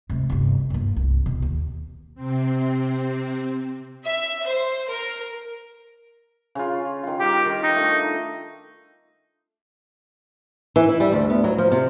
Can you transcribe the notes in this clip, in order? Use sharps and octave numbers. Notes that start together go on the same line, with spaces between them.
C3 G#3
G1 C3
G2 A#3
C2
B2 D#3
D#2
C3 C4
E5
C5
A#4
C#3 F4
D#3 F4
G3 F4 G4 A#4
D#3
D#4
A3 D4
E3
E4
G3
D2
B3
F#3
F3
C3